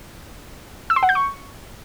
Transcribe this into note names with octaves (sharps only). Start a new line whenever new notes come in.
E6
C6
F#5
G6
C#6